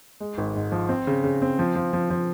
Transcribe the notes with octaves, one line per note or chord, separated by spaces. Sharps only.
G#3
G#1
G#2
F3
C4
C#3
C#3
C4
F3
F3
F3
F3